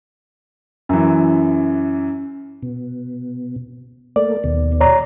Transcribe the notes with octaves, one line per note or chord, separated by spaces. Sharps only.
F#2 E3
B2
A3 A#3 D5
D#2 B2
C#5 D5 A#5